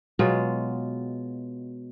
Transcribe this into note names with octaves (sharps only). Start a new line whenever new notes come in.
B2 F#3 G#3 F4